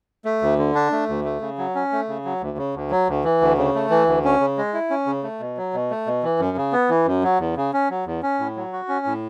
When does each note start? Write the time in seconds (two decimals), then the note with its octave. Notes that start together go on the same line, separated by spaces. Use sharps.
0.25 A3
0.41 D2
0.58 D3
0.75 D4
0.92 A3
1.08 D2
1.25 A3
1.41 C#3
1.58 F#3
1.75 C#4
1.92 A3
2.08 C#3
2.25 F#3
2.41 D2
2.58 C#3
2.75 D2
2.91 F#3
3.07 D2
3.24 E3
3.41 D2
3.58 C#3
3.75 A3
3.90 E3
4.07 D2
4.25 C#4
4.40 C#3
4.58 G#3
4.73 E4
4.90 C#4
5.06 C#3
5.23 A3
5.40 B2
5.57 F#3
5.73 B2
5.91 A3
6.06 B2
6.23 E3
6.40 F#2
6.57 C#3
6.73 B3
6.89 E3
7.06 F#2
7.24 F#3
7.39 E2
7.56 C#3
7.73 C#4
7.90 F#3
8.06 E2
8.23 C#4
8.39 A2
8.56 F#3
8.73 F#4
8.88 C#4
9.06 A2